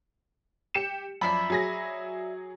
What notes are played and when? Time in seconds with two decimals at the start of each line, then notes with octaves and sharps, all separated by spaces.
0.74 G4 C#7 E7
1.21 F#2 F3 D5 E5 B5
1.50 F#3 G#4 A#6